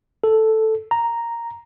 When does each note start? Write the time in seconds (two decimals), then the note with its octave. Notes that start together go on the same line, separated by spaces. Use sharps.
0.24 A4
0.91 A#5